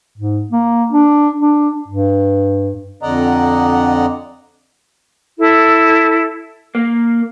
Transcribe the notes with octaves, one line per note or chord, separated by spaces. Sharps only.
G#2
A#3
D4
D4
G2
F2 D3 D5 D#5 F#5 A#5
E4 A4
A#3